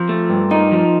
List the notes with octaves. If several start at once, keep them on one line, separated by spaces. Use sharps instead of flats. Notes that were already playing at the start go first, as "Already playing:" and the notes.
Already playing: F3 C4 F4 G4 A#4
A3
G2
A#3 D#4
F3